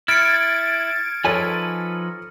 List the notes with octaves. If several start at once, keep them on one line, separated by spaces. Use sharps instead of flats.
E4 F6 G#6 A6 C#7 D7
F3 D#4 A4 B4 C#5 G#5